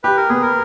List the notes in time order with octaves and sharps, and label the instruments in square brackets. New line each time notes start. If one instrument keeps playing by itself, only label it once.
[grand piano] G4 [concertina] B4
[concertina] A#4
[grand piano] B3 [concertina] G#4
[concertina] A#4